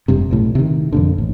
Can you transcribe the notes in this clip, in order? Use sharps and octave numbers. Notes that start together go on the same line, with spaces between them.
F1 G2 C3
B1 A2
C3 D#3
F2 A#2 D3
A1